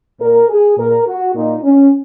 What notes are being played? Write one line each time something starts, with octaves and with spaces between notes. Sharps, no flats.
A#2 A#4
G#4
A#2 A#4
F#4
A#2 D#4
C#4